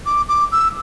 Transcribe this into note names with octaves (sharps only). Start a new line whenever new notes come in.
D6
D6
E6